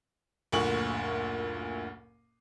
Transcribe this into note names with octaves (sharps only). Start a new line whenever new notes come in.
F#1 D2 A#2 C#6 F#7